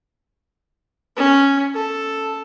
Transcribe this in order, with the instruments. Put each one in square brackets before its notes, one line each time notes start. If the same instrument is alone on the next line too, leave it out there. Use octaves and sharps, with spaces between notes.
[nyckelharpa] C#4
A4